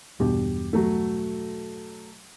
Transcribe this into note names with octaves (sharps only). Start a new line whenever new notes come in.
E1 G2 B2 G4
F#3 A3